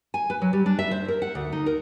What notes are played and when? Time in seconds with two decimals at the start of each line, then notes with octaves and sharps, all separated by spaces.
0.14 G#5
0.30 B4
0.42 F#3
0.53 G3
0.66 D4
0.79 E5
0.91 C5
1.08 A#4
1.22 F#5
1.35 D2
1.52 D#4
1.66 A#4